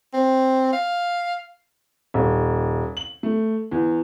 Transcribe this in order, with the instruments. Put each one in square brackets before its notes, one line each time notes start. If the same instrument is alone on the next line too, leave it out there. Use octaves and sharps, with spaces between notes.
[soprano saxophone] C4
F5
[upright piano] D#1
F#7
A3
E2